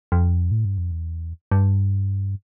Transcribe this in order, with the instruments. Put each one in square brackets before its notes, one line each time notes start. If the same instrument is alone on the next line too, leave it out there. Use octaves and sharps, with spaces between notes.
[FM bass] F2
A2
G2
F2
E2
G2